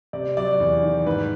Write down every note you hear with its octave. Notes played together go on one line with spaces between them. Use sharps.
C3 D5
F#3 D5
E2
D#3
G#2 B4